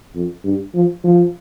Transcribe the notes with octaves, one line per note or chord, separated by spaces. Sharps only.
F2
G2
F3
F3